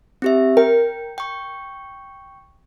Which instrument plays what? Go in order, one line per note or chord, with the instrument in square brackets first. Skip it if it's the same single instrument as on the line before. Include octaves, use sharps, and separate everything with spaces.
[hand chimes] C4 G4 E5
[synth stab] A#4 [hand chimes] G5
[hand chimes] G5 C#6